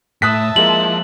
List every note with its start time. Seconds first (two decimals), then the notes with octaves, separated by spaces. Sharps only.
0.22 A2 E5 A5 D#6 F#6 B6
0.56 F3 G#3 A#3 E4 F#7